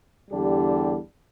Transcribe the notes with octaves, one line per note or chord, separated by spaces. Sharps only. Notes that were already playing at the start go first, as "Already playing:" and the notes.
E2 D3 G3 D4 G4